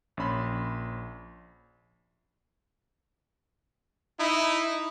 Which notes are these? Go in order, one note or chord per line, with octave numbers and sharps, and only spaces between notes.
A#1 C#4 B5 C6
D#4 E4